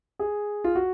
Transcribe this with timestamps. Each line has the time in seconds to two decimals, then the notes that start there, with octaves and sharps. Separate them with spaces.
0.19 G#4
0.64 F4
0.75 F#4